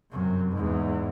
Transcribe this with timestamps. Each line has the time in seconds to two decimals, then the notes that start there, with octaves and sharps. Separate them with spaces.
0.11 F#2 C3
0.53 E2 G#2